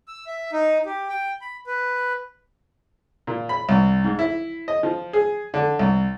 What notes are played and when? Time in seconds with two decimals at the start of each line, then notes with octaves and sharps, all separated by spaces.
0.08 E6
0.27 E5
0.53 D#4
0.86 G4
1.09 G5
1.41 B5
1.67 B4
3.27 A#2
3.49 B5
3.69 C2
4.04 G#2
4.19 E4
4.68 D#5
4.83 F3
5.13 G#4
5.54 D3
5.79 C2